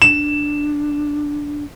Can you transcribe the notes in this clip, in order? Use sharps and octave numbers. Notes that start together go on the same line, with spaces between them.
D4 E7